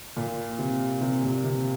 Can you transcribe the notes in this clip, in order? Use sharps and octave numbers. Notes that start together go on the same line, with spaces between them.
A#2
C3
C3
A#2
C3